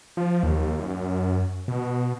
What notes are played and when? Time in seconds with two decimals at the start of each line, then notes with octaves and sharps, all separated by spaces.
0.17 F3
0.43 D#2
0.79 F#2
1.68 B2